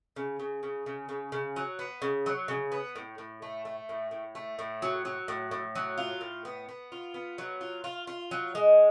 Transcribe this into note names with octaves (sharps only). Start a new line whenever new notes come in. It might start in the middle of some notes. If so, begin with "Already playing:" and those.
C#3
C#3
C#3
C#3
C#3
C#3
F#3
B3
C#3
F#3
C#3
B3
A2
A2
A3
A3
A2
A2
A3
A2
F#3
F#3
A2
A2
F#3
F4
A2
B3
B3
F4
B3
F#3
F4
F4
F4
F#3
G#3